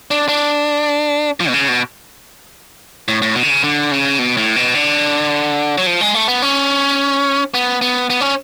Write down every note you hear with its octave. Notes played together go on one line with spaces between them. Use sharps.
D4
D4
F3
B2
C#3
B2
A2
A2
B2
D3
C#3
D3
C#3
B2
A2
B2
D3
F#3
F3
G#3
A3
B3
C#4
B3
B3
B3
C#4